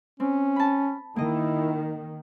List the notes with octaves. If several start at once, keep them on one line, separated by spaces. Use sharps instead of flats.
C4 C#4
A5 B5
D#3 A#3 E4 D#5